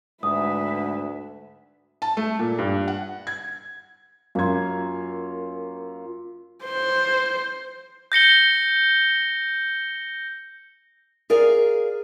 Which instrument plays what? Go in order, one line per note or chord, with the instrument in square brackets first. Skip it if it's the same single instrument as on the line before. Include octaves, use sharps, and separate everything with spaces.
[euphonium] D2 [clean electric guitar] G#2 [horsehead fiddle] B4 E5 [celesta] D#6
[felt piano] A5
A3
A#2
G2
F#5
G#6
[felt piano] F#2 G#6 [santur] A#3 F4
[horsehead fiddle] C5
[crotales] G6 A#6 C#7 G7
[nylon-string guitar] G#4 A#4 D5 F5